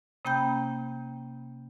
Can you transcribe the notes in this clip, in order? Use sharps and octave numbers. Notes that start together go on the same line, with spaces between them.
C3 A#3 C#4 G5 B5 G6